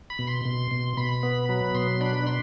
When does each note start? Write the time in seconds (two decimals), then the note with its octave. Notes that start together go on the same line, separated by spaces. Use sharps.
0.10 B5
0.19 B2
0.27 C6
0.45 B2
0.71 B2
0.97 B2 B5
1.23 B3
1.49 F#3 B5
1.75 B2 C6
2.01 D4 B5
2.27 D4 C6